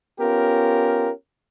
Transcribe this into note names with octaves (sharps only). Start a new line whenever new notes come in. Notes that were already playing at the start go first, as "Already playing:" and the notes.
B3 C#4 F4 G4 A#4